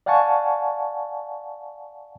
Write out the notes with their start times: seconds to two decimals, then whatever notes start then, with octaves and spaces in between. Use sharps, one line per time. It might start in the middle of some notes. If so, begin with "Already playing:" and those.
0.06 D5 F5 F#5 G#5 A5 C#6